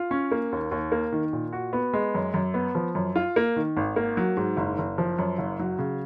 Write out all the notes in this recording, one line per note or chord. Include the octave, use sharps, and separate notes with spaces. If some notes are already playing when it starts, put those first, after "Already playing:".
Already playing: F4
C#4
A#3
D#2
D#2
A#3
D#3
A#2
F#4
B3
G#3
F#2
F#2
B3
F3
F#2
F4
A#3
D#3
G#1
A#3
F#3
G#2
F#1
F#1
F3
F#2
F#1
F#3
C#3